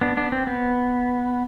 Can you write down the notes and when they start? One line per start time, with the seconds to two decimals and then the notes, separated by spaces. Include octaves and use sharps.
0.01 B3 D4
0.17 B3 D4
0.32 C4
0.47 B3